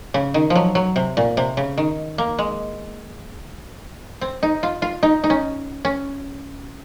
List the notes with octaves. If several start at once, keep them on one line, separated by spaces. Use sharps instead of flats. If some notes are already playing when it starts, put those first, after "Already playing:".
C#3
D#3
F3
F#3
F#3
C3
A#2
C3
C#3
D#3
A#3
G#3
C4
D#4
F4
F4
D#4
D#4
C#4
C#4